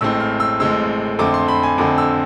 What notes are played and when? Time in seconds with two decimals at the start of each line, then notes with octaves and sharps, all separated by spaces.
0.01 A1 A2 G#3 C4 E6
0.20 F6
0.40 E6
0.60 A1 A2 G#3 C4 E6
1.19 F2 D3 A3 C4 D6
1.34 C6
1.48 B5
1.63 G#5
1.78 F2 D3 A3 C4 D6
1.98 E6